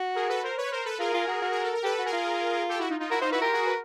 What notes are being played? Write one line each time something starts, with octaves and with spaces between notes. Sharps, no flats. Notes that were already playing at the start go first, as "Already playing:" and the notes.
Already playing: F#4
G#4 A#4
A4 B4
A#4 C5
B4 C#5
A#4 C5
A4 B4
F4 G#4 A#4
F4
F#4
F#4
G#4
A4
A#4
G4 A4 B4
F#4
G#4 A#4
F4
G4 A4
E4 F#4
D#4 F4
D#4 F4
E4 F#4 A#4
D#4 F4 C5
E4 F#4 B4
F4 G4 A#4
F#4 G#4
B4